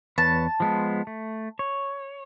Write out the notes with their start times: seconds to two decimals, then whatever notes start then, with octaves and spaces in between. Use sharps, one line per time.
0.18 E2 B4 C#5 A5
0.60 F3 G#3 B3
1.07 A3
1.59 C#5